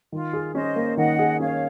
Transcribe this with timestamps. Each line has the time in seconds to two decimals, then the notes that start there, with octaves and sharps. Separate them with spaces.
0.12 D#3 F4
0.33 G#4
0.54 C#4 C5 D#5
0.76 A#3
0.97 D#3 D#5 F#5
1.19 G#4
1.40 C#4 C#5 F5